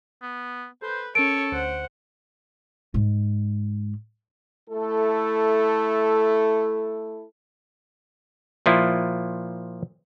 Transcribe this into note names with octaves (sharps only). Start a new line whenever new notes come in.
B3
A4 B4 C5 G6
C#4 A4 A#4 C#5 D7
D2 C5 F#5
G#2 G#3
A3 E4 A4
A#2 F3 E4 F4